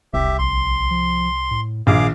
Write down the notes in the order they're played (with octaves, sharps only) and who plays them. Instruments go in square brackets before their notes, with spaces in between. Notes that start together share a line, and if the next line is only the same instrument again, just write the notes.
[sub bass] E1 [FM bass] C2 [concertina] G4 E5
[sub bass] A#1 [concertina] C6
[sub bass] F3
A2
[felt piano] A#1 [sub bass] D#3 [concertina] G#4 F5 D6